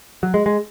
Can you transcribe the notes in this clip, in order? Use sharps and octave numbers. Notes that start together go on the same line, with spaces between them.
F#3
G#3
G#3